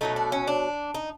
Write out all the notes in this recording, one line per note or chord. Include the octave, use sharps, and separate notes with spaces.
B2 F#3 A3 D#4
D4
C#4
D4
D#4